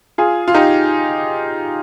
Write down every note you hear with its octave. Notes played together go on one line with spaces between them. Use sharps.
F4 G#4
F4
D#4 G4